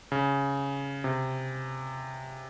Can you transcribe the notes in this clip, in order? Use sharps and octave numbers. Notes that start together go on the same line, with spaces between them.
C#3
C3